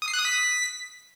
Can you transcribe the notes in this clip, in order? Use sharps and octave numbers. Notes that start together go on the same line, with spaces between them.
D#6
C7
F#6
D#6
B6